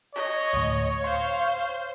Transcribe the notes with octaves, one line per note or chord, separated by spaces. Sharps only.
C#5 D#5
D2 A2
C5 F5 C6